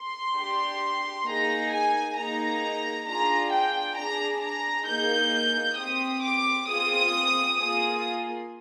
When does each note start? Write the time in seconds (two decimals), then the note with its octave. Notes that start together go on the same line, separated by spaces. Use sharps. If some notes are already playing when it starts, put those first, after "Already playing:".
Already playing: C6
0.36 D4 G4
1.26 A#3 D#4 G#4 A#5
1.71 G#5
2.16 A#3 D#4 G#4 A#5
3.06 D4 F4 G#4 A#5
3.52 G5
3.97 D4 G#4 A#5
4.42 A#5
4.87 A#3 D#4 G#4 G6
5.77 C4 G4 D#6
6.23 D6
6.67 C4 F4 G#4 D#6
7.58 A#3 F4 G#4 D#6